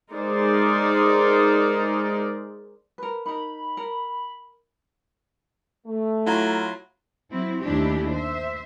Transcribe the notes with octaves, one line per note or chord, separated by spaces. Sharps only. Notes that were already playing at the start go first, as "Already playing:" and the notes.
G#3 D#4 A#4 C5 D5
A#4 B4
D#4 A#4 B5
A#4
A3
F#3 E4 F4 A#5
F#3 C4 E4
D#2 A3 D4 E4 G4
C5 E5